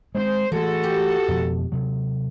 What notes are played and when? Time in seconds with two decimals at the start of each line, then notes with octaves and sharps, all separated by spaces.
0.15 G#3 A3 C4 C5
0.52 E3 G#3 A3 F#4 A4
0.84 G4
1.28 F2 B2 F3
1.72 C3 F#3